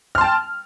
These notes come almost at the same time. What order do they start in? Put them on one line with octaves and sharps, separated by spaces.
F6 C6 A5 G5